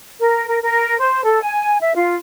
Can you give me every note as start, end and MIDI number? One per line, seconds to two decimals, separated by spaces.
0.20 0.45 70
0.48 0.58 70
0.63 0.96 70
0.99 1.24 72
1.24 1.42 69
1.42 1.77 80
1.80 1.92 76
1.95 2.15 65